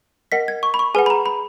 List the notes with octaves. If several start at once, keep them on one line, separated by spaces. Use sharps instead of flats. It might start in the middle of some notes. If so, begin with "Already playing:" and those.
A#4 D#5 F#5 B6
G#6
C#6
B5
C#6
G#4 B4 F#5 G#5
B5
A#5
B5